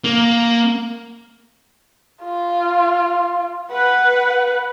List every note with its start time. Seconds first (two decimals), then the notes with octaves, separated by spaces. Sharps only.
0.04 A#3
2.23 F4
3.72 B4 F#5